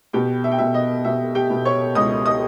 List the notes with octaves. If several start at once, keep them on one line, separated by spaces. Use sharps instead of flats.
B2 G4 G5
E5
G5
B2 E5
D#5
B2 E5
G4 G5
B2
C#5 C#6
C#2 D#5 D#6
D#5 D#6